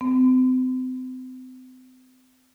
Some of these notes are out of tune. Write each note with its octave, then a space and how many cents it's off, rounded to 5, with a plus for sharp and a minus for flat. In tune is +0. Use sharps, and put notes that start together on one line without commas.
C4 -35